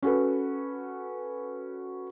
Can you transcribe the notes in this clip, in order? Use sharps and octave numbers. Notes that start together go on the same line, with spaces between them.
C#4 F#4 A4 B4